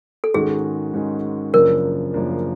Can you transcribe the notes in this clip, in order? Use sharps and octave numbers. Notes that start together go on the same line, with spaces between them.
A4
G#2 D#3 G#3 C#4 F#4 G#4
G#2 D#3 G#3 C#4 F#4
F#2 C#3 F3 A#3 D4 A#4
F#2 C#3 F3 A#3 D4